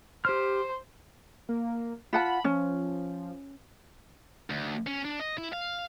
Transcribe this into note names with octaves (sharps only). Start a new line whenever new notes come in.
G4 C5 F6
A#3
F4 F#5 A5 B5
F3 C#4
D2
C#4
D4
D#5
E4
F5